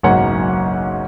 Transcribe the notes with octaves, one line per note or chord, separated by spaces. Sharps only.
F#1 B1 G#2 F#3 C#5 F#5